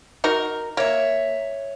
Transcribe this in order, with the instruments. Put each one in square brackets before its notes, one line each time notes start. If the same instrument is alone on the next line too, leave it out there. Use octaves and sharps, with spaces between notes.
[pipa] D#4 F#4 A#4
[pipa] A#3 [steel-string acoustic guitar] C#5 E5